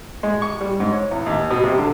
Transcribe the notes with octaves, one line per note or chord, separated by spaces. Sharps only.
G#3
C#6
G3
G#2
C#5
E2
D#2
B2
C3
D3